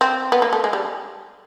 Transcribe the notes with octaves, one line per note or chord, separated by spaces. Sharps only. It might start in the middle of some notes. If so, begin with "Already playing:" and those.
C4
B3
A#3
A3
G#3
G3